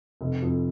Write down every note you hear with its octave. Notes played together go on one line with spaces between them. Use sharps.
F1
F2